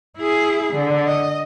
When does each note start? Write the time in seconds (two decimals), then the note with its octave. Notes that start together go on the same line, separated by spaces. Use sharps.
0.18 E4 G#4
0.74 D3
1.06 D#5